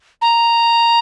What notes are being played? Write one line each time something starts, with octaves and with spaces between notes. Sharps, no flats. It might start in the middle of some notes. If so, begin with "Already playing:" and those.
A#5